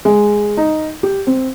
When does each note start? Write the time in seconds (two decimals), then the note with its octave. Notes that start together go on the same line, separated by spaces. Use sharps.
0.05 G#3
0.57 D#4
1.03 G4
1.27 C4